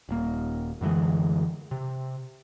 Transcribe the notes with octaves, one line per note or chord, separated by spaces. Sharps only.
D#1 A#3
F#2 D3 E3 G#3
C3